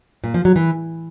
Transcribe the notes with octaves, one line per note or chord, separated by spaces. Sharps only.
A#2
F3
F#3
E3